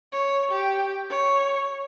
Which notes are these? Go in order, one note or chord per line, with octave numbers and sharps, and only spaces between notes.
C#5
G4
C#5